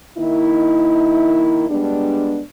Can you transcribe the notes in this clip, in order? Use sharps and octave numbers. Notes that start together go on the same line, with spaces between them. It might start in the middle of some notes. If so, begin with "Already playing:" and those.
D#3 A#3 D#4 E4
G3 G#3 B3 D4